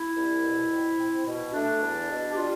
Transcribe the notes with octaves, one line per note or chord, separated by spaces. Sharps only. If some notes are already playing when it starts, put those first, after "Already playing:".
Already playing: E4
C2
B2
C4
C4
B2
A3 D4
E2
B2
G4
G3 F4